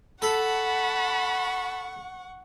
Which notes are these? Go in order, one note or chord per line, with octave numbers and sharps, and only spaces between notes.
A4 F#5 A5 B5 C#6